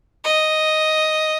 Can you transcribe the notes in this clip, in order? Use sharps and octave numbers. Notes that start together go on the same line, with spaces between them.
D#5